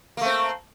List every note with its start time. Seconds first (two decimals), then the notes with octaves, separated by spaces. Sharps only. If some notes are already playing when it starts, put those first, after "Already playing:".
0.17 A#3
0.21 A3
0.25 C4